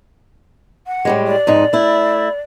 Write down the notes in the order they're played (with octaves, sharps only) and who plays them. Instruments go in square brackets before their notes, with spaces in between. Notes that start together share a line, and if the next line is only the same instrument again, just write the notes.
[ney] F#5
[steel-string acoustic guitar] A2 G3 G#3
[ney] D5
[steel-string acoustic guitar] F2 G#2 D#4
A3 E4